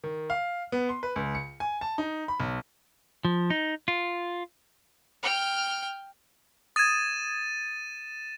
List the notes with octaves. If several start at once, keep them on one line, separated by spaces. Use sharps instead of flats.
D#3
F5
B3
C6
B4
C#2
C#7
G#5
A5
D#4
B5
B1
F3
D#4
F4
G5 F6
D#6 G#6 A6 D#7 E7